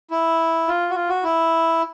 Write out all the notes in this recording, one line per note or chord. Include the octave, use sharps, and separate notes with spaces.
E4
F4
F#4
F4
F#4
E4